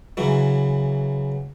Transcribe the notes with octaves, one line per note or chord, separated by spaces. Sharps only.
C#3 E3 F#3